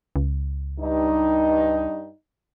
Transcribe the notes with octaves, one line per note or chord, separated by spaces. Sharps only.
C#2
G2 D#4